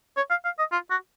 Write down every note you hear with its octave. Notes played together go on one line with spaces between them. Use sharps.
C#5
F5
F5
D#5
F4
F#4